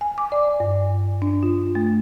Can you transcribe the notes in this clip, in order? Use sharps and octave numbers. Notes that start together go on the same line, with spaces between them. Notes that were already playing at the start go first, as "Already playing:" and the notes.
G#5
D6
D5
G2
D4
F4
A3